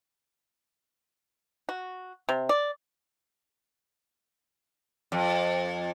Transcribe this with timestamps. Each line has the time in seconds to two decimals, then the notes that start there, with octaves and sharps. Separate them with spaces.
1.69 F#4
2.29 C3
2.49 D5
5.12 F2